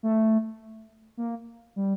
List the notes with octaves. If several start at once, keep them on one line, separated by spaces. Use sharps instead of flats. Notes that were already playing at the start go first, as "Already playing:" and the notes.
A3
A#3
G3